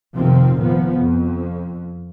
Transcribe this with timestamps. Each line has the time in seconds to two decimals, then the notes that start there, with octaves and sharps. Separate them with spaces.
0.15 F1 C3 D#3 F3 C4
0.58 A#2 F3 B3
1.00 F2